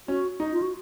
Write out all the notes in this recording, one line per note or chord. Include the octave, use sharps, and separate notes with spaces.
C#4 F#4
D#4
F4
F#4